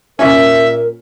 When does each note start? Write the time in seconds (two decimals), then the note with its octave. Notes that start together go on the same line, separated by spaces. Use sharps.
0.19 C2 A#2 A#3 C#4 A#4 E5